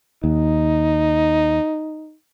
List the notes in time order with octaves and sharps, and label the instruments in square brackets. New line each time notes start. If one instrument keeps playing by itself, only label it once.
[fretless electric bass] D#2 [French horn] D#4